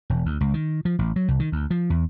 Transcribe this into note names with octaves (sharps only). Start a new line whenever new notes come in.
E1
D2
C#2
D#3
F3
A1
F#3
C2
D#3
D2
F3
E2